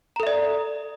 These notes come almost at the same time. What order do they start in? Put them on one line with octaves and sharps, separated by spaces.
A#5 A4 E5 D5